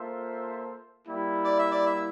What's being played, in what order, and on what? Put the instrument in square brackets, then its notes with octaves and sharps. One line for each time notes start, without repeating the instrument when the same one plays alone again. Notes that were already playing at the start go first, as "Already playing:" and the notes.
Already playing: [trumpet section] A#3 F4 A4 C5 E5
G3 A#3 E4
[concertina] D5
E5
D5
E5